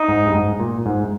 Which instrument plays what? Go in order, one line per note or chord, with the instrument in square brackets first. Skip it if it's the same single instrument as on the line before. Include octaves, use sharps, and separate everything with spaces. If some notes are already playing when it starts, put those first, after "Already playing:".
Already playing: [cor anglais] D#4
[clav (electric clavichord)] G#2
G2
G#2
A#2
G#2